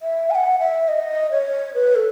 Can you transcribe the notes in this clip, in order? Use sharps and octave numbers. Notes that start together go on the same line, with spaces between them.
E5
G#5
F#5
E5
D#5
C#5
B4
A4